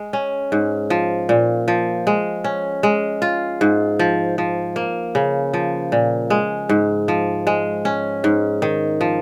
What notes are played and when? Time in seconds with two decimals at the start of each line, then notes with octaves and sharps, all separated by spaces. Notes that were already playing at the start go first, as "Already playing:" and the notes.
Already playing: G#3
0.13 C#4
0.52 G#2
0.90 F3
1.29 A#2
1.68 F3
2.07 G#3
2.44 C#4
2.83 G#3
3.22 F4
3.61 G#2
3.99 F3
4.38 F3
4.76 A#3
5.15 C#3
5.53 F3
5.92 A#2
6.30 G#3
6.69 G#2
7.08 F3
7.47 G#3
7.85 C#4
8.24 G#2
8.62 D#3
9.01 F3